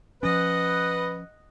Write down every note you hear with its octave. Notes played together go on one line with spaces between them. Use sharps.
F3 C#4 B4 D#5 F#5